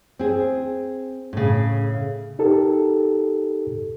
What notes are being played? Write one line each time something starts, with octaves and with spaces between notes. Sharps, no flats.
C4 G#4
A2 C#3
D#4 G4 A4 A#4